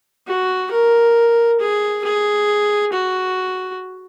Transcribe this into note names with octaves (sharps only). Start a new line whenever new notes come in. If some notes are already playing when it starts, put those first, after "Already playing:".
F#4
A#4
G#4
G#4
F#4